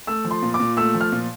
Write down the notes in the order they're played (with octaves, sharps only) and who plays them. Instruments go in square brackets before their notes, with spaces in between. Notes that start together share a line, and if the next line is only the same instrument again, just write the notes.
[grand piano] A3 E6
F3
C6
A#2
D6
A#2
A3 E6
F3
F6
A#2